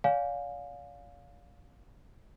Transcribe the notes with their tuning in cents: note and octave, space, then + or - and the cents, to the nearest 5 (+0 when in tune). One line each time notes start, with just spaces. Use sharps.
D5 -45 F5 +20 G#5 +0